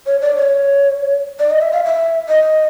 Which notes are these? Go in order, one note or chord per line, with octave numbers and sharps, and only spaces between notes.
C#5
D5
C#5
D5
D#5
E5
F5
E5
D#5